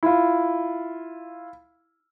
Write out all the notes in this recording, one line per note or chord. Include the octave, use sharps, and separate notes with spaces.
E4 F4